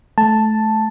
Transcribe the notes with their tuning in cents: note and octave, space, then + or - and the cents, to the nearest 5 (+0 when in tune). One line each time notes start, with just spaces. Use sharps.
A3 -25 A5 +0